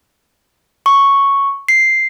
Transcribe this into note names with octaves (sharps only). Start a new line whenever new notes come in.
C#6
C7